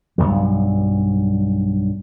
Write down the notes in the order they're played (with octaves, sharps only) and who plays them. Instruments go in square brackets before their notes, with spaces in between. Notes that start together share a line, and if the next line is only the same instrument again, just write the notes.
[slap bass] B1 E2 G2 F#3